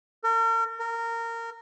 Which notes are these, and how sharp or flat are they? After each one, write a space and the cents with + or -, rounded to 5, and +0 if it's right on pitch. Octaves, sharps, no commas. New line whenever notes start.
A#4 -40
A#4 -20